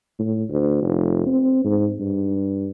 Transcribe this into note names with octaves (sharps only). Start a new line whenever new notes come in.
A2
D2
F1
C4
G#2
G2